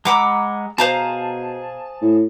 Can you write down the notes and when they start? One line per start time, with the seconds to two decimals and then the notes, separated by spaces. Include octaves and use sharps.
0.05 G#3 F#5 A#5 B5 D6 E6
0.78 B2 G#4 C5 F5 A5 A#5
2.02 A2